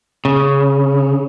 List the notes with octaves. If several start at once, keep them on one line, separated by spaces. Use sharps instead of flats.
C#3